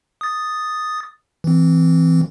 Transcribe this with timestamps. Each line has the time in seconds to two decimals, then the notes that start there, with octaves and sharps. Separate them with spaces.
0.21 D#6 A6
1.44 E3 C4